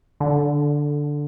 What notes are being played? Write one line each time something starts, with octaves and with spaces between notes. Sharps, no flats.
D3